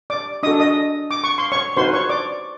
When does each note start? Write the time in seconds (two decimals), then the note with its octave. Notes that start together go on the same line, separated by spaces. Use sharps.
0.10 D5 D6
0.43 D4 F#4 A4 D#5 D#6
0.60 D#5 D#6
1.11 D6
1.24 C#6
1.38 C6
1.52 C#5 C#6
1.77 D#4 F#4 B4 C5 C6
1.93 C#5 C#6
2.09 D5 D6